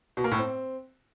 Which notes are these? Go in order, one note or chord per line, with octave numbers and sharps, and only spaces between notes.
B2
A#3
A2
C4